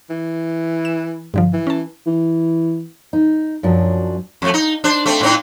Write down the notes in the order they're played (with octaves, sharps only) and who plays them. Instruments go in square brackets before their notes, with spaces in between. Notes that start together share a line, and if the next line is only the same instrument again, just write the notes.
[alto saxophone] E3
[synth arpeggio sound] E7
G2 D3 F3
[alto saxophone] E3
[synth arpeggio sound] C#4 A5
[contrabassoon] E3
[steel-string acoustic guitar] D#4
F#2 F3 F#3 D4
[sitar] F2 A3
D#4
D4 C5
A3 C4
A2 C4 D#4